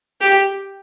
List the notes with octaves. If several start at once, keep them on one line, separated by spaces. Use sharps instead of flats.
G4